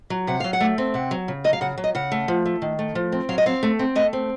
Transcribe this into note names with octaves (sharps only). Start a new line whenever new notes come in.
F#3
C3 F#5
F#3 F5
F#5
A3
C4
C3 F#5
F#3
C#3
F#3 D#5
F5
C#3 F#5
F#3
D#5
C#3 F#5
A3
F3
A3
D#3
A3
F3
C4
F#3 F5
D#5
C4 F5
A3
C4
A3 D#5
C4